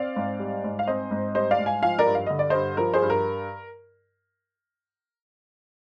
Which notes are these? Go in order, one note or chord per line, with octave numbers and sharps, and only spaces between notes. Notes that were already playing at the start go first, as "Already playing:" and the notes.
Already playing: C4 D5 F5
G#2
G3
G#2
F5
C4 C5 D#5
G#2
G3 C5 D#5
D5 F5
G#2
F5 G#5
F3 F5 G#5
A#4 D5
G2
F5
D3 D#5
D5
G2 C5 D#5
F3 A#4
G#4 C5
G2
A#4